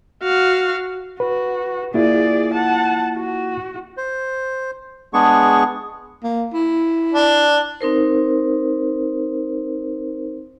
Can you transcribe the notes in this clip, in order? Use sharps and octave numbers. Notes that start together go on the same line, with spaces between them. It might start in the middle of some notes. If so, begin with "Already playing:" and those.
F#4 F5
F#4 B4
A#3 E4 F4 G#4 D5
F#5 A5
F#4
C5
G#3 B3 D4 G#4 C#6
A#3
E4
D4
C4 D#4 A#4 C5